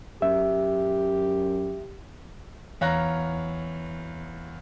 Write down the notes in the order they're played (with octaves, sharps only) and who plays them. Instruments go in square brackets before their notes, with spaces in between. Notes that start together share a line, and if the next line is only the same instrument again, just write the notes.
[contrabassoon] F#2 [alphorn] G4 [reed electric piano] E5
[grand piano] E2 C#5 F5 A#5 F#6 A#6